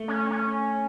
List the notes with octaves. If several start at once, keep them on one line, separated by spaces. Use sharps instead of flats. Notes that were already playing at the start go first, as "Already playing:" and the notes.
Already playing: A3
C#4
C#4